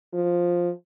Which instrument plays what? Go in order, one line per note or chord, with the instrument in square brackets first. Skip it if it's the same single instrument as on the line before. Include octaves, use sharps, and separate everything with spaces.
[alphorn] F3